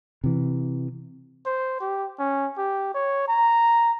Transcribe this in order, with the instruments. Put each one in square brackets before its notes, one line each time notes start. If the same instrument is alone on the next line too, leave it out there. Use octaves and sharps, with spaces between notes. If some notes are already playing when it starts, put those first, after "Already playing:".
[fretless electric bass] C3 E3
[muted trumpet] C5
G4
C#4
G4
C#5
A#5